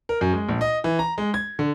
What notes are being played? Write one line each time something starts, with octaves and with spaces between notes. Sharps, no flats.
A#4
F#2
G#3
A#1
D#5
E3
A#5
G#3
G#6
D3